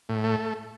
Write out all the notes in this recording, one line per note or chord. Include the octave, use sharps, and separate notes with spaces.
A2
A3